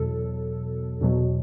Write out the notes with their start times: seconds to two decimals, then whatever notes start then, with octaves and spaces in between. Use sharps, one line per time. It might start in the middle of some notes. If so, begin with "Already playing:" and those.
Already playing: E2 B2 F#3 A4
1.01 E2 B2 F#3